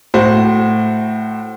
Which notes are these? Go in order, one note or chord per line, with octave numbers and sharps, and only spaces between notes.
A2 F#4 C5